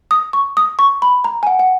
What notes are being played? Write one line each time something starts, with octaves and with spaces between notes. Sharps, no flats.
D#6
C#6
D#6
C#6
B5
A#5
G#5
F#5
F#5